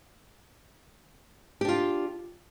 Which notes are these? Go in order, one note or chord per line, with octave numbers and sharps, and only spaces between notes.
D4 F4 G4